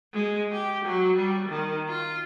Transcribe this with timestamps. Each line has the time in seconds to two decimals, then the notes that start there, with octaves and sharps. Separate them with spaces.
0.13 G#3
0.52 G4
0.85 F#3
1.16 G3
1.49 D#3
1.89 F4